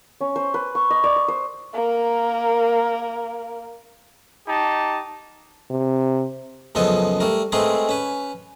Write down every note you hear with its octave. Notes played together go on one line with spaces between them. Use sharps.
C#4
C5
B4
C#6
D#5
D5
C#6
C5
A#3 A#4
D#4 G4 A5
C3
C#2 F#2 F3 B3 A4 D#5
G3 A3 A#4
G#3 A3 C4 G#4 A#4 B4
C#4 B4